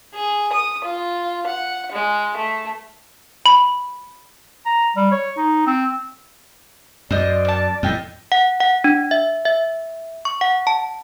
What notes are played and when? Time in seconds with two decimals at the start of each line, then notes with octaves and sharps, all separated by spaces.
0.15 G#4
0.52 D#6
0.85 F4
1.47 F#5
1.92 G#3
2.36 A3
3.46 B5
4.66 A#5
4.96 G3
5.12 C#5
5.38 D#4
5.67 C4
7.11 F#2 C5 D5 D#5
7.45 A#3 A5
7.83 F2 A2 D#5 G5
8.32 F#5
8.60 F#5
8.84 D4
9.11 E5
9.45 E5
10.25 C#6
10.41 F#5
10.67 A5